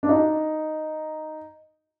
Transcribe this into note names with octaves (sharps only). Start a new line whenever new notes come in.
D4
D#4